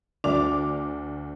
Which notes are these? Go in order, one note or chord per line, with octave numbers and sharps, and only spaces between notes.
D2 D5 D6 F7